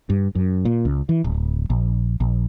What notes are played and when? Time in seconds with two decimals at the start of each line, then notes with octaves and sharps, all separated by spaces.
0.10 G2
0.35 F#2
0.65 A#2
0.85 C#2
1.09 E3
1.24 D1
1.70 A#1
2.20 A#1